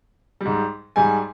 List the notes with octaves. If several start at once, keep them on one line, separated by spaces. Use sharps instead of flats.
G#2 G3
G#2 G3 G#5